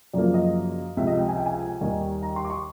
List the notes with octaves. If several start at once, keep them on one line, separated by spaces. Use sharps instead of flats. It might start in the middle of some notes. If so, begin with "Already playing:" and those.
F#2 C#3 F3 A#3 D5
D#5
C#2 C3 F3 E5
D#5
G5
G#5
G5
G#5
D#2 D#3 G3
A#5
C6
D6
C#6